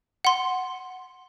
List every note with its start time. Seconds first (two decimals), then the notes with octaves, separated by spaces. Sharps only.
0.25 F#5 C6